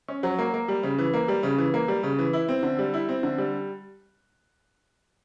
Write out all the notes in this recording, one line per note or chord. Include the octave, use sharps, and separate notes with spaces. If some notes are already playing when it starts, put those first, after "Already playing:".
C#4
F#3
A#3
A#3
G3
C#3
E3
A#3
G3
C#3
E3
A#3
G3
C#3
E3
E4
C4
D3
G3
E4
C4
D3
G3